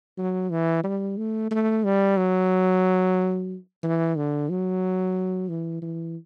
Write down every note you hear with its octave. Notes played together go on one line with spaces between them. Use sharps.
F#3
E3
G3
A3
A3
G3
F#3
E3
D3
F#3
E3
E3